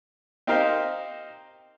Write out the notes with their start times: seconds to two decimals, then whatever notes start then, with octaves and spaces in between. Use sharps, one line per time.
0.47 C4 D#4 G4 A#4 C5 F5